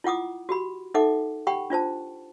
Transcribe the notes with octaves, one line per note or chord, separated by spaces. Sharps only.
E4 F4 F#5 D6 D#6
F#4 G4 B5
D#4 A4 E5 F#5 D6
G4 F#5 G5 B5 C#6
D4 F4 C5 A5